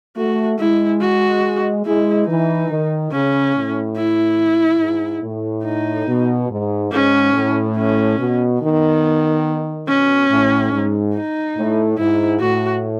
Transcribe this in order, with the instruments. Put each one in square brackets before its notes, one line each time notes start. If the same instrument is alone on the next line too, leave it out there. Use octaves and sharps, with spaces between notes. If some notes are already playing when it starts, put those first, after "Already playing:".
[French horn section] A3 [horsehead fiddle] F#4
[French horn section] G#3 [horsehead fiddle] E4
[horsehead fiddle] F#4
[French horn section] G#3 [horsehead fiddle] E4
[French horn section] E3 [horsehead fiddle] D#4
[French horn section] D#3
[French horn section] C#3 [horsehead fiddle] C#4
[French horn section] A2
[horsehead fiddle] E4
[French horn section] G#2
A2
[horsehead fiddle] D#4
[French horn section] B2
G#2
[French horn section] G#2 [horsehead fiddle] C#4
[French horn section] A2
[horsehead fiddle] C#4
[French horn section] B2
[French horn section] D#3 [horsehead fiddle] B3
[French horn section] B2 [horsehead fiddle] C#4
[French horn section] A2
G#2
[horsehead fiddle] D#4
[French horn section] A2
[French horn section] G#2 [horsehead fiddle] E4
[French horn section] A2 [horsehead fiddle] F#4